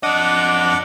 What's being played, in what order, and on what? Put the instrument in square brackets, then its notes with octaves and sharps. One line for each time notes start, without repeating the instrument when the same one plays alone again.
[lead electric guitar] F2 D#5 [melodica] D4 F#5 D6